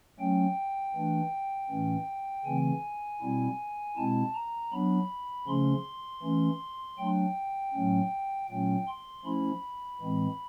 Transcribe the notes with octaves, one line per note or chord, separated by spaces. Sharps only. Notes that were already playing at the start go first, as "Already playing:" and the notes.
F#3 A3 C#4 G5
E3 A3 D4
A2 E3 A3 C#4
C#3 E3 A3 C4 G#5
B2 G3 C4 E4
B2 G#3 C4 E4 A5
A#5
F#3 B3 D4 B5
C#3 F3 A3 C#4 C6
E3 A3 C#4
F#3 A3 D4 G5
A2 F#3 A3 C#4
A#2 F#3 A3 C#4 G5
C6
F3 A3 C#4 E4 B5
A2 E3 G#3 C4